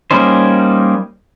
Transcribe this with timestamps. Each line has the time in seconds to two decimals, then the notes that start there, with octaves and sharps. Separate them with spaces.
0.11 G3 A#3 C#4 D#4 C5